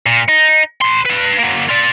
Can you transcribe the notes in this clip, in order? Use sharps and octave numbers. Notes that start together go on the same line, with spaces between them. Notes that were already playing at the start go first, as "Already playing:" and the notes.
A#2
D#4
B4 C6
B4 F5
F#3 A#3
F4 D5